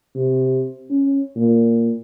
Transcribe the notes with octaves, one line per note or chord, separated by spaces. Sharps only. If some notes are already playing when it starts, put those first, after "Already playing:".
C3
C#4
A#2